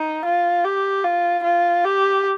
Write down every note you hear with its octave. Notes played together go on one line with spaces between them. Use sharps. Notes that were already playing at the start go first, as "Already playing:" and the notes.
Already playing: D#4
F4
G4
F4
F4
G4